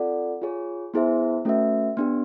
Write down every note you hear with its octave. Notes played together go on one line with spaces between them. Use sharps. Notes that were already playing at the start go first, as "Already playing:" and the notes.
Already playing: C4 F4 A4 D5 F#5
F4 G#4 C#5
B3 E4 G#4 C5 E5
A3 C#4 F#4 B4 E5
B3 D4 G4